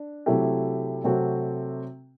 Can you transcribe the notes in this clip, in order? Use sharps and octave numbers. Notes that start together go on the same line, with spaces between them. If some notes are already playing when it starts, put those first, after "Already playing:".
Already playing: D4
C3 F#3 A3 E4 G4
C3 F#3 A3 C4 F#4